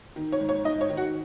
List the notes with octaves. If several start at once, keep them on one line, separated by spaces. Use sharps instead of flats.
D#3
C#5
G#2
C#5
G#2 D#5
C#5
D#3
F#4